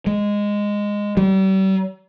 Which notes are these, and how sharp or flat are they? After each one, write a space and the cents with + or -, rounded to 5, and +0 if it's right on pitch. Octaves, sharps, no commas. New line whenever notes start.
G#3 -10
G3 -40